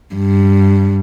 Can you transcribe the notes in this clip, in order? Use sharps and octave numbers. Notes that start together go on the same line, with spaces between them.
G2